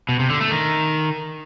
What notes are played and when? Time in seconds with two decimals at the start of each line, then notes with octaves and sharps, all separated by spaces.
0.09 B2
0.19 C3
0.30 D3
0.41 A3
0.51 D#3